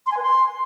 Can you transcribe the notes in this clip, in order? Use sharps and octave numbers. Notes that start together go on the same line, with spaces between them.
C6
G#5
B4
C6